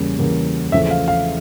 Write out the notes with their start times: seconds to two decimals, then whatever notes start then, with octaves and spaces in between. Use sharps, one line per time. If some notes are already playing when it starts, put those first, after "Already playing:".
Already playing: E2 C#3 G3 A#3
0.18 E2 C#3 G3 A#3
0.72 E2 C#3 F3 A3 E5
0.91 F5
1.08 F5